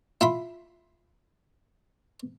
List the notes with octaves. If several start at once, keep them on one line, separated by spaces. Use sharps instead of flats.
E4 F4 B5